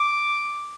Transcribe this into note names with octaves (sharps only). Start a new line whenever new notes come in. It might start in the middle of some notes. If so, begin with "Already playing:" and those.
Already playing: D6